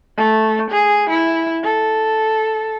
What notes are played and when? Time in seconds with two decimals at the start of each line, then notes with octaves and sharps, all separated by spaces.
0.17 A3
0.71 G#4
1.09 E4
1.63 A4